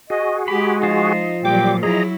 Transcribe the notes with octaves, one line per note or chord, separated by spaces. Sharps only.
F#4 G#4 D#5
G#3 G4 B5
F3 D#4 F4 C5
A#2 F#3 G3 G5 D6
F#3 E4 G#4 D#5 A#5